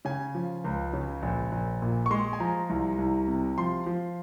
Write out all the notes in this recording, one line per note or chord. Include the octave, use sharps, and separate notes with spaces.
C#3 G#5
F3
C#2
C#3
A#1
A#1
A#2
C#6
G#3 C6
G#5
F3 A#5
C2
C2
C3
F3 C6
F3